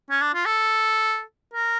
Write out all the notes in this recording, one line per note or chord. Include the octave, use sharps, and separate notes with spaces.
C#4
D4
F4
A4
A#4